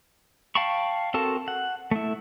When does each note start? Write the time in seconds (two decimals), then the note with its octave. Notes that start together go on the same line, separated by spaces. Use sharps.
0.55 F5 G5 A5 B5 C#6
1.14 C4 F#4 A4 A#4 A5
1.48 F#5
1.91 A3 E4